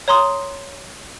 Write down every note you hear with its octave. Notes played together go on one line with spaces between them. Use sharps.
C#5 A#5 C6 D#6